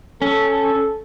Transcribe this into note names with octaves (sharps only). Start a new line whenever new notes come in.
C#4 A4